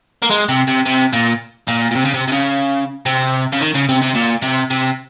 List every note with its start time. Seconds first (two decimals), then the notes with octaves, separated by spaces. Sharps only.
0.23 A#3
0.31 G#3
0.49 C3
0.67 C3
0.85 C3
1.13 A#2
1.68 A#2
1.91 A#2
1.95 C3
2.05 C#3
2.14 C3
2.28 C3
2.32 C#3
3.06 C3
3.52 C#3
3.60 D#3
3.74 C#3
3.89 C3
4.02 C3
4.16 A#2
4.43 C3
4.71 C3